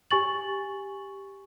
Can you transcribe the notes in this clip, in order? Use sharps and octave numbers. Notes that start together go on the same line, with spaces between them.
G4 G#5 C#6 A6 F#7